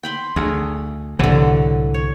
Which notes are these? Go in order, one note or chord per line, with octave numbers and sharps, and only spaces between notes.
G5 B5 C6
D2 G#4
C2 A2 D3 E3 F#3
C#5